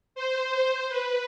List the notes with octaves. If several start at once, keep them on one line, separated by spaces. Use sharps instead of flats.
C5
B4